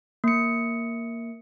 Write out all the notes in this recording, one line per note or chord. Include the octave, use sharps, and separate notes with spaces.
A#3 C#7